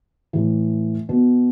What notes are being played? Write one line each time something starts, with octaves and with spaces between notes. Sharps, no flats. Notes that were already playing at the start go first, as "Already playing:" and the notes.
A2 E3
B2